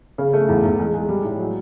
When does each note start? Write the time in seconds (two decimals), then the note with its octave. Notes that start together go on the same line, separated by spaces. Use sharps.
0.18 C#3
0.33 A3
0.49 E2
0.64 E2
0.79 G#3
0.94 G#3
1.09 G3
1.24 A2
1.39 F#3